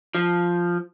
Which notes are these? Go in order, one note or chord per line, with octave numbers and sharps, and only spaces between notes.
F3